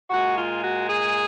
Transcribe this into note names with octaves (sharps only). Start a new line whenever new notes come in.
A#2 G#3 F#4
F4
F#4
G#4